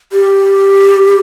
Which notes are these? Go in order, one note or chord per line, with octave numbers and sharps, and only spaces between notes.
G4